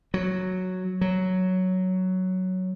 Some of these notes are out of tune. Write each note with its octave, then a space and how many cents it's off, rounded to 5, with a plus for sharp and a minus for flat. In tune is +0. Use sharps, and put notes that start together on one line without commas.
F#3 -5
F#3 +5